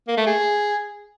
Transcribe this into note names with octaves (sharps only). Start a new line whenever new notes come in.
A#3
A3
G#4